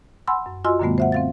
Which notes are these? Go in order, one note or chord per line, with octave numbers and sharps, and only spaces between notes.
F#5 G#5 B5 C6 E6
F#2
F4 F#4 D#5 G#5 C6 E6
F#2 A#2 D3 G3 A3 B3
C5 E5 F#5
C4 F5 A6